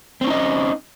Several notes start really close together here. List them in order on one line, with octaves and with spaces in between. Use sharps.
C4 C#4 D#4 D#5